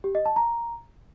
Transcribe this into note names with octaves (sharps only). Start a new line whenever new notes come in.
G4
D#5
A5
A#5